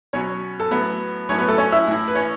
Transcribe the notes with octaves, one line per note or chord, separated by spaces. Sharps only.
B2 F#3 C#4 C#5
A4
A2 F#3 B3 B4
A2 F#3 C#4 C#5
B3 B4
A3 A4
C#4 C#5
E4 E5
A2 E3
B4
C#4 C#5